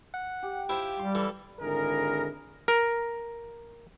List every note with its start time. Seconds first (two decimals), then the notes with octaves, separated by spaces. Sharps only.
0.14 F#5
0.43 G4
0.69 E4 F4 G4 C5
1.00 G3 C6
1.15 E3 A4
1.60 G#1 D3 E4 G#4 A#4
2.68 A#4